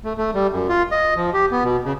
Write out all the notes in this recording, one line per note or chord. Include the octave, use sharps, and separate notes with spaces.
A3
A3
G3
F#2
F4
D#5
F3
G4
B3
B2
C#3